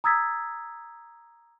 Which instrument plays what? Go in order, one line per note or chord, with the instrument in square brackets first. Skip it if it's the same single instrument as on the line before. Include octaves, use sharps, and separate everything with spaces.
[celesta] A#5 D#6 E6 G#6 A6 B6